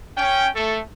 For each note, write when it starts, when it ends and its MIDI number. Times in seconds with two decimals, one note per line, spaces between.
0.18 0.49 61
0.18 0.49 79
0.56 0.80 57
0.56 0.80 69